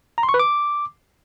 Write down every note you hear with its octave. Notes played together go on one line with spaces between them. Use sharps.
A#5
C6
C#6
B4
D6